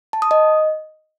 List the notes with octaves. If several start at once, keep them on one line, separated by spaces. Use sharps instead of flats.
A5
D#6
D#5